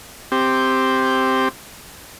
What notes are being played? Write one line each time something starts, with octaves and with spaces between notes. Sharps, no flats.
C4 G4